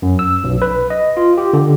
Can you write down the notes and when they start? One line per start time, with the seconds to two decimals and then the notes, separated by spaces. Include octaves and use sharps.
0.02 F#2
0.19 E6
0.44 B1
0.62 B4
0.90 D#5
1.17 F4
1.38 G4
1.53 D3